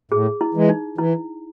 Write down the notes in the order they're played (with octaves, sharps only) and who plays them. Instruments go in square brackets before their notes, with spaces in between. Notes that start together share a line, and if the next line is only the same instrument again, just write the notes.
[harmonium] A2 [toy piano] G#4
[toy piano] E4
[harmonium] E3 G#3
[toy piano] D#4
[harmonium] E3 [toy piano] E4